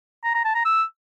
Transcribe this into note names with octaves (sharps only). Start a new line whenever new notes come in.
A#5
A#5
A5
A#5
E6